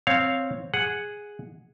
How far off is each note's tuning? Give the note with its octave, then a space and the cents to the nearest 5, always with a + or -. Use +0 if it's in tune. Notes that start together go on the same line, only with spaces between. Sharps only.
C4 +0 C#5 +0 F5 +0
G#4 -5 F#5 +0